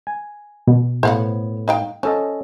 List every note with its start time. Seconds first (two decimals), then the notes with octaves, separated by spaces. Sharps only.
0.07 G#5
0.67 B2
1.03 A2 B3 C5 F5 F#5
1.68 D#4 F5 G5
2.03 F3 C#4 A4 D#5